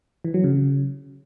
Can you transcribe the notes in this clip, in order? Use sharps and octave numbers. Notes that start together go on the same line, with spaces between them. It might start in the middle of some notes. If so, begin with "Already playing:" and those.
E3
F#3
C#3